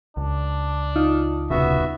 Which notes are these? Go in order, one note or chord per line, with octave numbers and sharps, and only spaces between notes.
C#2 D4
D#4 F4
D#1 C2 C#3 B3 F#4 E5